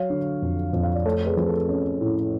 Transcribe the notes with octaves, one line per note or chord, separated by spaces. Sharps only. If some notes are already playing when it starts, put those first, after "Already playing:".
Already playing: F#3 C#5 F5
D3
F2
F2
F5
D5
A3 A4 C#5
G#4 B4
F3
A4
C#4
A2